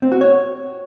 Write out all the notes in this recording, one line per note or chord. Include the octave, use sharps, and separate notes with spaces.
C4
F#4
C#5